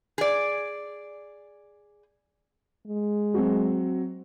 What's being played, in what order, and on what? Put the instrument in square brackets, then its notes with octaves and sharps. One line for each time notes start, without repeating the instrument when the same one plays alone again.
[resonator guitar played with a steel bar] G#4 D5
[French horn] G#3
[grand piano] F#3 C4 F#4